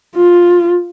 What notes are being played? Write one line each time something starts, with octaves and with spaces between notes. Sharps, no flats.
F4